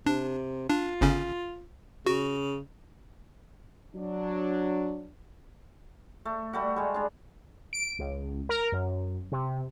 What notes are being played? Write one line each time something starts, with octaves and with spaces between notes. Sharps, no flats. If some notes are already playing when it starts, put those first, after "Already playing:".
C3 D4
D4 F4
G1 C#3 C#4
C#3 F#4
F#3 D4
A3
G3 A3 F#4
G3 G#3
G#3 D4
D7
C#2
A#4
F#2
C3